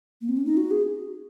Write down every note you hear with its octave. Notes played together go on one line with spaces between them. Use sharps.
A#3
C4
C#4
D#4
F#4
G#4